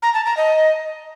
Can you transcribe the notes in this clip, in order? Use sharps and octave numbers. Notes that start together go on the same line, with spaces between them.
A#5
A5
A#5
D#5